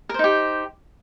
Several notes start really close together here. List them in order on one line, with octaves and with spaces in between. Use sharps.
A#4 C5 D#4 G4